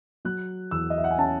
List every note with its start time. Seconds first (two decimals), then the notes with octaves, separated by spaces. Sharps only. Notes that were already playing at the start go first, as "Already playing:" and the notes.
0.25 F#3 F#6
0.71 E2 E6
0.90 D#5
0.98 E5
1.04 F#5
1.11 G#5
1.18 C#4 A5